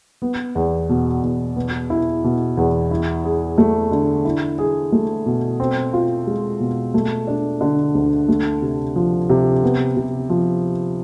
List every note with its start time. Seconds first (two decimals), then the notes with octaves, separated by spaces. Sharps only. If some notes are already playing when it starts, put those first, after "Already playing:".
0.22 B3
0.55 E2
0.89 B2
1.23 E2
1.56 B3
1.90 E4
2.24 B2
2.57 E2
2.91 E4
3.25 G#4
3.58 A3
3.91 D3
4.25 E4
4.58 G#4
4.92 A3
5.26 B2
5.60 C4
5.93 F4
6.27 G#3
6.60 B2
6.94 A3
7.27 D4
7.61 D3
7.95 D2
8.28 A3
8.62 C3
8.96 F3
9.29 C3
9.63 B3
9.97 C3
10.30 F3